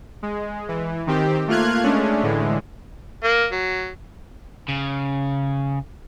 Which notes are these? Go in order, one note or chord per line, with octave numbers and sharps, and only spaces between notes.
G#3
E3
D#3 C4 G4
A3 A#3 F4 F6 F#6 G#6
G#3 A3 C#4 D4
A2 D3 E3 G#3
A#3
F#3
C#3